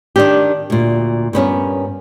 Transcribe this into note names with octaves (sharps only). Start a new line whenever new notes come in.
D#3 D4 G4
D2 A#2
G2 B3 C#4 A#4